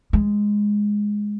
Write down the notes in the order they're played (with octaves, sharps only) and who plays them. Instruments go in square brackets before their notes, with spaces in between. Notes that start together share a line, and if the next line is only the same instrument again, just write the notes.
[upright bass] G#3